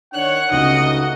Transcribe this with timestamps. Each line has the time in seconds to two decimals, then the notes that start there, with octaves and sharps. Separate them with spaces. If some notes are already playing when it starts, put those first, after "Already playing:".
0.14 D#3 D4 C#5 F#5 F#6
0.51 C#2 C#3 A3 D#4 F#4 D#5